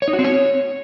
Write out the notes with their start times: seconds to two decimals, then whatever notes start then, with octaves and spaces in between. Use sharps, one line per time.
0.02 C#5
0.08 D#4
0.13 F#4
0.19 C4
0.24 C#5